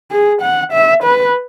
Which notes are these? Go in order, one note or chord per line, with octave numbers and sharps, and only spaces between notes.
G#4
F#5
E5
B4